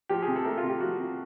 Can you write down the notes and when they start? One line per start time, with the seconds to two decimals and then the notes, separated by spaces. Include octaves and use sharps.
0.09 F3 G4
0.22 C3 G#4
0.36 A4
0.45 A3 A#4
0.58 C3 F4
0.69 G4
0.80 F3 F#4
0.98 C3